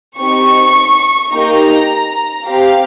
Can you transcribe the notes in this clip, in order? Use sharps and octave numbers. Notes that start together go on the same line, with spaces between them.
C4 D#4 G4 C#6
A#3 D#4 G4 A#5
C4 G4 F5